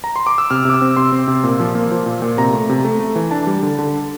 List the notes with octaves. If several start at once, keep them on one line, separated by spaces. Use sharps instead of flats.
A#5
C6
D6
E6
C3 F6
C3 D6
E6
C4
C3 C6
C4
C3
A#2
F3
A#3
F3
A#2
A#2
C3 A#5
A3
C3
A3
A3
E3
D4 A5
G3
D3
D3